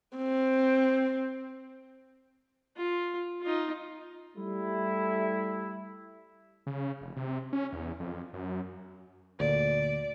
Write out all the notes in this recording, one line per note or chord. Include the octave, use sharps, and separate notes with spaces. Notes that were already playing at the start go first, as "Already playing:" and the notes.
C4
F4
D#4 F4
G3 A3 E4
C#3
F1
C3
C#4
E2
F2
F#2
D2 A#2 D5